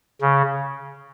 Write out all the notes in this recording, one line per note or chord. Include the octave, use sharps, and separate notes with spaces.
C#3